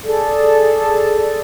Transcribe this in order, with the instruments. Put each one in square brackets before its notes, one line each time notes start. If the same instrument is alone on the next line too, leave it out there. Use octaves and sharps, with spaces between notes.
[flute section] G#4 A4 D5